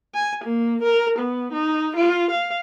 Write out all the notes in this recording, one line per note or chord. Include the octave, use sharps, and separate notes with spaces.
G#5
A#3
A#4
B3
D#4
F4
F5